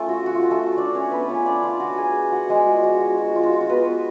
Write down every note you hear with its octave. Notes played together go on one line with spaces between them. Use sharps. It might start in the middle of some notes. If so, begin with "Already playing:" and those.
Already playing: A3 C#4 F4 A4
F#4
F#4
F4
F#4
A3 A4
D4 D5
C#4 C#5
B3 B4
D5
A3 C#4 F4 C#5
D4 D5
F4 F5
F#4 F#5
G#4 G#5
F#4 F#5
G#3 G#4
G#3 D4 F4 F#4
F#4
F#4
F#4
F4
F#4
F4
F#4
B3 B4